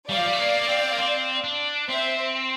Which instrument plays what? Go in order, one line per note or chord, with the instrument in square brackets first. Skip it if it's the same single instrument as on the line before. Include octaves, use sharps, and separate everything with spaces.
[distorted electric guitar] G3 [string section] D5 F5
[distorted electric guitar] F3
G3
A3
A#3
A#3
C4
A#3
C4
D4
[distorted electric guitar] C4 [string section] C5 E5